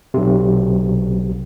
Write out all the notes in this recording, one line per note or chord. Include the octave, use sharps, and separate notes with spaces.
B1 C3